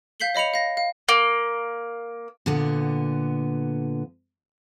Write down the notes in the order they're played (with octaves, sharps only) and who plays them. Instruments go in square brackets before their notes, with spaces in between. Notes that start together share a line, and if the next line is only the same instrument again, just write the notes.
[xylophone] F5 G6 B6 C7 F#7 G7
C#5 D#5 B5 C#7 F7
F5 A#6
F5
[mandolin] A#3
[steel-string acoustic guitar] A#2 D3 B3